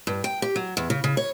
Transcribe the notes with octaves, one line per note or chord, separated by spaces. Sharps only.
G2
G5
G4
F#3
E2
C#3
C#3
C#5